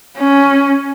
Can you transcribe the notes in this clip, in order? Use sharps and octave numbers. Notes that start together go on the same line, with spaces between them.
C#4